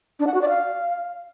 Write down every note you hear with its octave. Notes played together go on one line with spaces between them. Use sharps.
D4
F#5
F#4
D5
F5